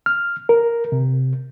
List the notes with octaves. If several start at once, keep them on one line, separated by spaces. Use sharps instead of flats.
F6
A#4
C3